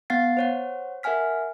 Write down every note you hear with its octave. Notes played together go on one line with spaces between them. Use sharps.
B3 F5 F#5 A6 C7
C5 C#5 F#5
A#4 E5 F#5 G#5 F6 B6